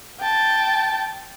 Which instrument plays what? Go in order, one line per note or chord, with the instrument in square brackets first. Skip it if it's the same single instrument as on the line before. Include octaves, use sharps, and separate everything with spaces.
[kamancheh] G5 A5